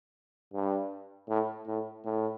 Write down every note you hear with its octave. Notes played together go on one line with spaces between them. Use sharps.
G2
A2
A2
A2